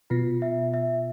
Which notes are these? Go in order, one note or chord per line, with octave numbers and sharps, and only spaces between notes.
B2 F4
E5
E5